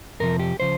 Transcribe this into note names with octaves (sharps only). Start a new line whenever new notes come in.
F2 C3 F3 A#4
G4
C#3 F3 C5